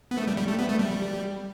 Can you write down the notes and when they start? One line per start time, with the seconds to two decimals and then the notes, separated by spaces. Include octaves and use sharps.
0.11 B3
0.18 A3
0.27 G3
0.37 G3
0.48 A3
0.59 B3
0.69 A3
0.79 G3